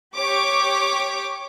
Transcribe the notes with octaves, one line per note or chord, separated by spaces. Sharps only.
G4 C#5 C#6 D6